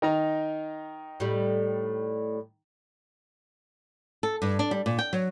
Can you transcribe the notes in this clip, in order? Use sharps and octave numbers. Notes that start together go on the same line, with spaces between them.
D#3 D#4 A#5
A2 G3
A4
G2
D4
G3
A#2
G5
F#3